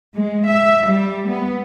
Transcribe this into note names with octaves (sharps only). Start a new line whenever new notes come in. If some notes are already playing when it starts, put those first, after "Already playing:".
G#3
E5
G3
B3